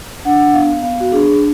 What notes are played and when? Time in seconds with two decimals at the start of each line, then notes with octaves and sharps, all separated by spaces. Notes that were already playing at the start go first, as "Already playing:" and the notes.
0.25 D4 F#5
0.54 B3 F5
0.83 B3 F5
1.00 F#4
1.12 D4 G#4